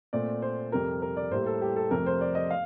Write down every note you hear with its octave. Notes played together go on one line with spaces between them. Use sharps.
A#2 A3 C4 D5
C5
F2 C3 G3 A#4
A#4
D5
A2 G3 A#3 C5
A4
G4
A4
F2 C3 F3 A3 A#4
C5
D5
D#5
F5